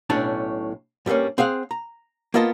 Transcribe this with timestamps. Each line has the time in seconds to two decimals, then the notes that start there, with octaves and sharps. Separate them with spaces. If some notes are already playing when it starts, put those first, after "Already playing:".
0.10 B1 A2 C#4 D4 A5
1.06 G2 G3 G#3 A#3 C#4
1.38 C4 G#4 F5 F#5
1.71 A#5
2.34 A#3 B3 F4 D#5 A5